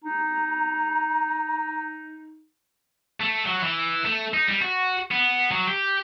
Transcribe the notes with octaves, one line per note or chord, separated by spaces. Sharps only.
D#4 A#5
A3
F#3
E3
A3
D#4
G3
F#4
B3
F#3
G4